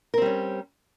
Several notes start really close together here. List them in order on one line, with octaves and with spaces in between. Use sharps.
A#4 C4 G3 C#4